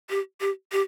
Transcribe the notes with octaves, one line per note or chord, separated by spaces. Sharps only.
G4
G4
G4